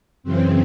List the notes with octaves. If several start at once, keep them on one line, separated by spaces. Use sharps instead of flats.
F#2 C#3 E3 C4